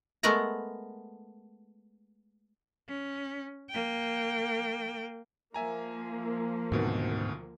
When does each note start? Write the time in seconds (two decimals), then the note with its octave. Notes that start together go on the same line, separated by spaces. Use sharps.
0.23 G#3 A3 B3 A#4 F#5 A#5
2.88 C#4
3.70 A#3 G5
5.54 F3 A#3 E5 G#5 A#5
6.72 D2 G#2 B2 D#3 C4